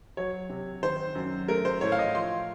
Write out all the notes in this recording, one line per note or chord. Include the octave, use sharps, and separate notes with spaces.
F#3 C#5
C3
D#3 C5
F#2
A3 A#4
C5
A2 C#5
F5
D#5
F3 C6